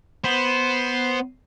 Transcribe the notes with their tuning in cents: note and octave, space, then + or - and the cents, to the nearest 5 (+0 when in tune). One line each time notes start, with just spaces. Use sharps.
B3 +0 C5 +0